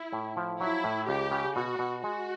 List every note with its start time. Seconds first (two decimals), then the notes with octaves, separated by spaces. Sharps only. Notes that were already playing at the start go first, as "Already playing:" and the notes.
Already playing: E4
0.13 A2
0.37 F3
0.60 F#3 E4
0.84 A2
1.08 C#2 G4
1.31 C#3
1.56 B2 F#4
1.79 B2
2.03 G#3 F#4